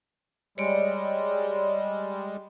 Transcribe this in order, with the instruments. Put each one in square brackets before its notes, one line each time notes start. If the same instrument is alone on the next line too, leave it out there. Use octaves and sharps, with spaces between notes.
[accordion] G3 G#3 [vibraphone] C#5 D5